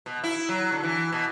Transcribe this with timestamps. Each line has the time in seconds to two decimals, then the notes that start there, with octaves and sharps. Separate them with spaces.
0.06 B2
0.24 E4
0.49 F#3
0.72 D3
0.83 E3
1.13 B2